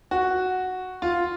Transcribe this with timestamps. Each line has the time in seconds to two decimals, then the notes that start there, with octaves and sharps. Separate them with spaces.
0.11 F#4
1.02 F4